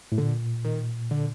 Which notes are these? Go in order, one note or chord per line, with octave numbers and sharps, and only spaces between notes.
A2
A#2 D3
D#3
D3